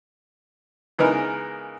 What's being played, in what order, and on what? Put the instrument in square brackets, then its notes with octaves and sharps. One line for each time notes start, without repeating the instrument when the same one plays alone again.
[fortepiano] C#3 E3 G#3 B3 D#4 A#4